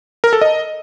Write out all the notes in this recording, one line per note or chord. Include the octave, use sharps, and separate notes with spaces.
A#4
A4
D#5